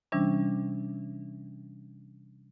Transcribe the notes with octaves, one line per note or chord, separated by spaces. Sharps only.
C3 E3 G3 C#4 D4